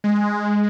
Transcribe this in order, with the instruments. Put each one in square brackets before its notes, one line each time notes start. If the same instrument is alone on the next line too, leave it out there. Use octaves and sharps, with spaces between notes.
[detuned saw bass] G#3